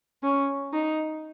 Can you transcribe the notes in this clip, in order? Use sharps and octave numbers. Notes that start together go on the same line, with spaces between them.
C#4
D#4